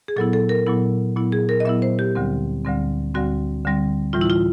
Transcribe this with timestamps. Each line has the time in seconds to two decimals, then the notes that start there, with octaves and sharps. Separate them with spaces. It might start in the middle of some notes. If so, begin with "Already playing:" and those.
0.08 G#4
0.16 A#2 F#3 B3 E4 A4
0.33 A4
0.49 A#4
0.66 A#2 F#3 B3 E4
1.16 A#2 F#3 B3 E4
1.32 G#4
1.49 A#4
1.60 D#5
1.65 A#2 F#3 B3 E4 E5
1.82 C5
1.99 G4
2.15 D2 D3 G3 C4
2.65 D2 D3 G3 C4
3.14 D2 D3 G3 C4 F#4
3.64 D2 D3 G3 C4
4.13 A2 E3 G3 F4
4.21 E4
4.30 F4